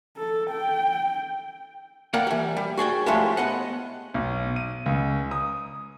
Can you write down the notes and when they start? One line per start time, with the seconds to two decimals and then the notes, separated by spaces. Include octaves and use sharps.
0.17 A4
0.51 G5
2.14 A#3 A#4 D5 F#5 G5 A#5
2.27 E3 G3
2.57 G3
2.77 F#4 G#4 D5 G5
3.06 F3 G#3 A3 C#4 E4 G4
3.37 B3 D#5 F#5
4.14 B1
4.56 D#7
4.86 C#2
5.31 D#6